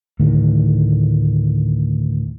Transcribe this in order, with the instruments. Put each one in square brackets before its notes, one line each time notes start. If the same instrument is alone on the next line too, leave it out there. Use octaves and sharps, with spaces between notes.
[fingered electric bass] D2 A2 D#3